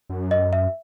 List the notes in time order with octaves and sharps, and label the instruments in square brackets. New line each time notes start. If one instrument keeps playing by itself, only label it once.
[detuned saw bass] F#2
[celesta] D#5
E5